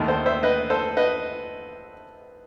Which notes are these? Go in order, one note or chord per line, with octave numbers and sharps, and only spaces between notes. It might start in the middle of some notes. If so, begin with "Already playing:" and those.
Already playing: D#2 D#3 A3
A4 C5
C5 E5
B4 D#5
A4 C5
B4 D#5